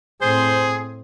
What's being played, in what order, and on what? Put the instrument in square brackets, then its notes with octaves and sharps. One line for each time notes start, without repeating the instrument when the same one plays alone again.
[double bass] A2 C4 [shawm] G#4 [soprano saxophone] C5